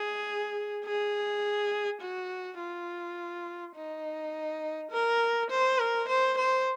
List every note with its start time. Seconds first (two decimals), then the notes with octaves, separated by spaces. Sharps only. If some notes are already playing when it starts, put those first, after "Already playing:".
Already playing: G#4
0.85 G#4
2.01 F#4
2.59 F4
3.75 D#4
4.91 A#4
5.50 C5
5.79 A#4
6.08 C5
6.38 C5